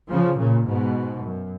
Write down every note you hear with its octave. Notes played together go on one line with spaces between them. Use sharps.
C#3 F3
A#2 C#3
G#2 B2
F#2